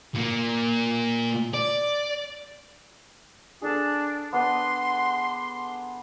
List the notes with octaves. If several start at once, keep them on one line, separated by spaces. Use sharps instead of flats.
A#2 A#3
D5
D4 G#4 A4 A5
B3 D4 B4 C6